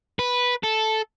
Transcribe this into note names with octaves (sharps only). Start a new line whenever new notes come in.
B4
A4